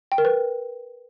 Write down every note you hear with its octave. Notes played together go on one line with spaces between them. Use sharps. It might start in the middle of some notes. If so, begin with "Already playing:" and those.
G5
A#4
B4